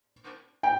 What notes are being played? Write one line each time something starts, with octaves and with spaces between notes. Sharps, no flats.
G5